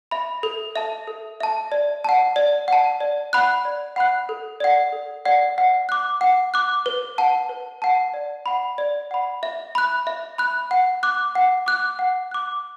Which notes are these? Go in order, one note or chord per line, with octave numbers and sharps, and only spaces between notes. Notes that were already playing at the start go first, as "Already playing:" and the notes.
E5 B5
A4
E5 A5
A4
E5 A5
D5
F#5 A5
D5
F#5 A5
D5
F#5 B5 F#6
D5
F#5 B5 F#6
A4
D5 F#5
A4
D5 F#5
F#5
D6 F#6
F#5
D6 F#6
B4
F#5 A5
B4
F#5 A5
D5
F#5 B5
D5
F#5 B5
E5
B5 F#6
E5
B5 F#6
F#5
D6 F#6
F#5
D6 F#6
F#5
D6 F#6